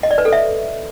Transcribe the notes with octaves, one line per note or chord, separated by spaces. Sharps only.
D#5
D5
B4
A4
E5